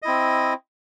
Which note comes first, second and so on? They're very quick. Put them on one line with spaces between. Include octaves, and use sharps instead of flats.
D#5 E4 C4